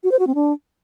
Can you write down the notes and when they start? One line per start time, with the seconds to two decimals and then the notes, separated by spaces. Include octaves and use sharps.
0.04 F#4
0.11 C5
0.19 F#4
0.27 C4
0.35 D4